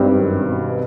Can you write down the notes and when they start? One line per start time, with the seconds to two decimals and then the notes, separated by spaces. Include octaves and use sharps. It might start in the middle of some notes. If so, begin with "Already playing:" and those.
Already playing: G#1 G2 D#3 G3 C4
0.16 F#2
0.43 B2